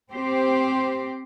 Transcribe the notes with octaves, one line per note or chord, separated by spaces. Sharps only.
C4 G4 C5